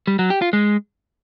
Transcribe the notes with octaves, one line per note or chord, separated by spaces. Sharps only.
G3
F#3
G4
F4
G#3